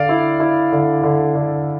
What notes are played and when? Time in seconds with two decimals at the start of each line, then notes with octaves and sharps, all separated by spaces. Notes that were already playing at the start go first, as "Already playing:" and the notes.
Already playing: D3 D5 F5
0.09 E4
0.40 E4
0.72 D3
1.03 D3
1.35 D3